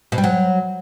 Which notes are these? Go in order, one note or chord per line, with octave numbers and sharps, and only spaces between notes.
B2
G3
F#3